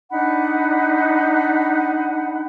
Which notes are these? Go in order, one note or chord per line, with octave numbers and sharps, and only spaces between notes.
D4 D#4 F#5 B5